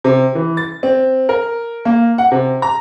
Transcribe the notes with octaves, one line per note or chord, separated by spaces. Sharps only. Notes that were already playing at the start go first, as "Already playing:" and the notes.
C3
E3
A6
C4
A#4
A#3
F#5
C3
A#5